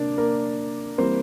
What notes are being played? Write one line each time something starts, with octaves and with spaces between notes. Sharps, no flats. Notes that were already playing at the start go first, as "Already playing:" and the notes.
Already playing: C3 A#3 D4 D5
A#3 A#4
E3 G3 A#3 C4 C5